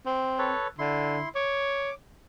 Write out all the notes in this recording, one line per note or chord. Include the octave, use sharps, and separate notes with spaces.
C4
A4 B4 C#5
D3 E4 C6
C#5 D6